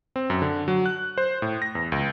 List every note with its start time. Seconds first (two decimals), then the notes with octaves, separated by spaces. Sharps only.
0.16 C4
0.30 F#2
0.42 D3
0.68 F#3
0.86 F#6
1.18 C5
1.42 A2
1.62 A#6
1.75 E2
1.92 C#2